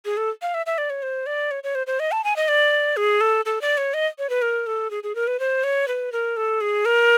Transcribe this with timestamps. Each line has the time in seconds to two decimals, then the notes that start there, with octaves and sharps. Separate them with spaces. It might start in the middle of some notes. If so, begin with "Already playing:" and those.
0.05 G#4
0.17 A4
0.42 F5
0.54 E5
0.66 E5
0.78 D5
0.90 C#5
1.03 C5
1.26 D5
1.51 C#5
1.64 C#5
1.75 C5
1.87 C5
2.00 D#5
2.12 A5
2.24 G#5
2.36 D#5
2.48 D5
2.97 G#4
3.21 A4
3.45 A4
3.61 D5
3.77 C#5
3.94 D#5
4.18 C#5
4.30 B4
4.42 A#4
4.67 A4
4.91 G#4
5.03 G#4
5.15 A#4
5.27 B4
5.40 C5
5.64 C#5
5.88 B4
6.12 A#4
6.37 A4
6.61 G#4
6.85 A#4